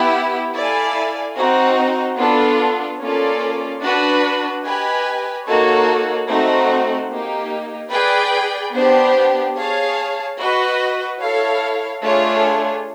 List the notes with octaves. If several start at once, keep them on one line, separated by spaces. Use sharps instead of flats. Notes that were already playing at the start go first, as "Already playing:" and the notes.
Already playing: B3 E4 G4
E4 A4 D5 F5 G#5
C4 D#4 F#4
B3 D4 F4 A4
A#3 C#4 F4 A4 D5
D4 F#4 B4
G4 B4 D#5 G#5
A#3 D#4 F#4 A4 C#5
A3 C4 D#4 F#4
A#3 D#4 G4
G#4 B4 D5 G5
B3 D4 G4 C5
G#4 C#5 F5 A5
F#4 B4 D#5
E4 A4 C#5 F5
A3 D4 F4 G#4 C#5